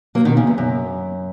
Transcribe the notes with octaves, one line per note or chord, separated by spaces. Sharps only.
F#3 A#3
B2 D#3
C#3
E2
F#2